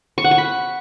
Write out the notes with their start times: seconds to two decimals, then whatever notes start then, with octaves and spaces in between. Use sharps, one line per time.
0.18 C#6
0.24 F#5
0.31 C#6
0.38 B5